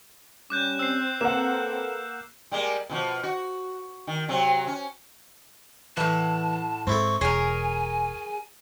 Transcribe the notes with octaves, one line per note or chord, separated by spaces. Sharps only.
G3 C#4 D6 F#6 G6
C4 E6 C7
A#3 A4 B4 F#5 E7
G3 G#3 A#3
B2 D#3 F3
F#4
D#3
C3 F#3 C4
C#4
A2 E3 F#5 A5
G#2 C4 E4 A4 C#6
E1 G#4 A#4 C#5 G#5